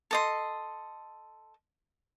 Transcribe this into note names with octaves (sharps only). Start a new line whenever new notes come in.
A4 D#5 C6